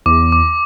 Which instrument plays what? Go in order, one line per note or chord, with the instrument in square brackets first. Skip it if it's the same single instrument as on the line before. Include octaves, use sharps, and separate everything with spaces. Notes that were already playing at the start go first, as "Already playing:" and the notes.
[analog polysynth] E2 [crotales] D6
[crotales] D6